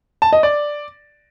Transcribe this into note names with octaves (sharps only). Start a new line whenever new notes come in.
A5
D#5
D5